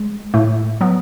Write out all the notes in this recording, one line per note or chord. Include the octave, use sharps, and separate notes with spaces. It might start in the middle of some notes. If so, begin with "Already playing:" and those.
Already playing: G#3
A2 A3
F#3 B3